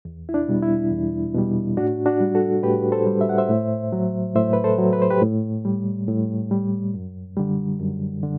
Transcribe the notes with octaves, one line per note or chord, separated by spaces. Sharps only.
E2
E4
D4
B2 G3
E4
E2
B2 G3
A2 D4 F#4
D4 F#4
G3
F#4 A4
A2 G4 B4
A4 C5
G3
E5
F#5
C5 E5
A2
F#3
A2 C5 E5
B4
A4 C5
F#3
B4
C5
G4 B4
A2
G3
A2
G3
F#2
D3 G3
F#2
D3